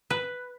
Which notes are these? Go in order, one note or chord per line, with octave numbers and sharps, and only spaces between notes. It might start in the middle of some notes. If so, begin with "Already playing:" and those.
B4